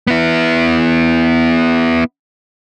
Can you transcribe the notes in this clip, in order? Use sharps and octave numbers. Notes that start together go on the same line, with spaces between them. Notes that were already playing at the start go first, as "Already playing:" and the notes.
B3 E4